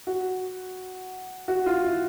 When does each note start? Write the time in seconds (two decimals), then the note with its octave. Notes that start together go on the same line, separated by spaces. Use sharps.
0.07 F#4
1.48 F#4
1.66 F4
1.84 E4